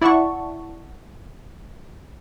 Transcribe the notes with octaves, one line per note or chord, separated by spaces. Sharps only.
E4 D5 E5 F#5 A5 C#6